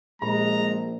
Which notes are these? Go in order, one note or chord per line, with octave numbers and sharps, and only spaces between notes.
A#1 A#2 G#3 A#5